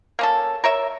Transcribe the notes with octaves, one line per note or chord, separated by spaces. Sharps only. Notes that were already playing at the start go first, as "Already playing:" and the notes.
A#3 C#4 A4
A#4 C#5 E5